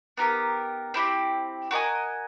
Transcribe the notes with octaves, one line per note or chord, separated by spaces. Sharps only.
B3 D#4 G4 A#4
C4 E4 G4
F#4 A#4 D#5 G#5